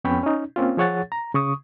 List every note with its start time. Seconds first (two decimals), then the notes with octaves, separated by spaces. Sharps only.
0.04 F2 B3 C#4 C#5 G5 B5
0.23 C#4 D#4
0.56 A#3 C4 C#4 F4
0.77 F3 G#4 C#5 F#5 A6
1.12 A#5
1.34 C#3 C#6 D#6